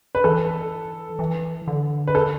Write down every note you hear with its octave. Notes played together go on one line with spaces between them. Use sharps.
B4
E3 A4
E3
D3
B4
A4